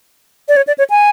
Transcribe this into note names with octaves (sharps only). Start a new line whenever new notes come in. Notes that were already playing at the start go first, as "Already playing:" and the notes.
D5
C#5
D5
C#5
G#5